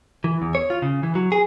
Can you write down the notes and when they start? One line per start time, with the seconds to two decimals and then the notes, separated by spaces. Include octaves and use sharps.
0.24 E3
0.42 E2
0.55 C#5
0.70 F4
0.82 C#3
1.03 E3
1.15 F#3
1.32 G#4